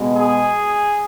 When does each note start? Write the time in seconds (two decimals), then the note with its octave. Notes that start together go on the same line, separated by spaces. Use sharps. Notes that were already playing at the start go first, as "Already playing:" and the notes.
Already playing: B2 G#3 B3
0.17 G#4